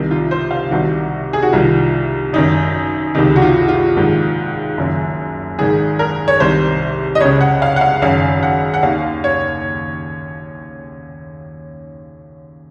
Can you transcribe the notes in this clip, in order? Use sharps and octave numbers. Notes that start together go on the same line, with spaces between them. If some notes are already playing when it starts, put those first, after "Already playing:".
Already playing: C2 C3 D#3
F4
C5
F5
C2 C3 D#3 F#4
G#4
F#4
C2 C3 D#3 F4
G#1 F#2 D#3 D#4
C#2 C3 D#3 D#4
F#4
F4
F4
A#1 G#2 D#3
F#1 F#2 D#3
G#1 G#2 D#3 G#4
A#4
C#5
C2 C3 D#3 C5
D#5
C#2 C#3 C#5
F#5
F5
F#5
F5
G#1 F#2 C#3 F5
F#5
F#5
D#2 D#3 F5
C#5